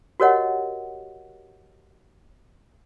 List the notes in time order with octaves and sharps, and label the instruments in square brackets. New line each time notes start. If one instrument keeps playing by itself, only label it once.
[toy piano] F#4 G4 A#4 C#5 D#5 F#5